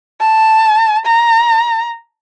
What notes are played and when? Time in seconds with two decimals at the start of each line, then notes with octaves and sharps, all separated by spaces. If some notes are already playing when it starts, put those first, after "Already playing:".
0.21 A5
1.05 A#5